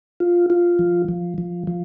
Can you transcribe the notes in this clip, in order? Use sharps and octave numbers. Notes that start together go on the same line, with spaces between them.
F4
F4
F3
F3
F3
F3